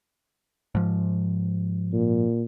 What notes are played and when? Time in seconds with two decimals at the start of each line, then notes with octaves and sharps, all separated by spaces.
0.75 G#2 F3
1.92 A#2